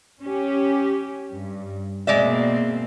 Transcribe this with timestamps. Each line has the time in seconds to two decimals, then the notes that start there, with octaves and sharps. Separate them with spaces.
0.21 C#4 G4
1.29 G2
2.07 B2 G#3 A#3 C4 D5 E5